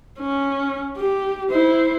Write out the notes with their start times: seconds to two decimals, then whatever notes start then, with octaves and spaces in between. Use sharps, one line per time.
0.20 C#4
0.97 G4
1.51 E4 C5